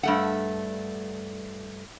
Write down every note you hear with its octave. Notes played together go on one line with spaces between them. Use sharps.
G2 A3 F#5